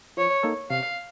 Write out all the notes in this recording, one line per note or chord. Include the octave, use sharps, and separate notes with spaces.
F3 C#5
A#3 D#4 A4 C#5
C3 F5